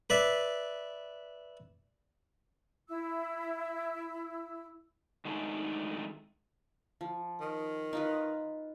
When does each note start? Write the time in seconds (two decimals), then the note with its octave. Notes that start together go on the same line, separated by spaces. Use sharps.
0.10 B4 D5 E5
2.89 E4 E6
5.25 D#3 F#3 G#3 A3 D4 D#4
7.01 F3
7.40 D#3
7.93 D#4 F4 B4